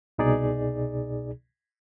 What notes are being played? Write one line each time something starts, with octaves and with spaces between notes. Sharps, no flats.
C2 B2 D#4 G#4 D5